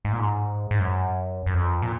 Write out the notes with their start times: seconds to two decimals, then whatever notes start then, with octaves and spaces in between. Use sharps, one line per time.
0.05 G#2
0.12 A#2
0.20 G#2
0.71 G#2
0.80 F#2
1.46 F#2
1.54 F2
1.82 A#2